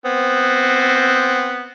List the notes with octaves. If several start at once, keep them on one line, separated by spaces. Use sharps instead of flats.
B3 C4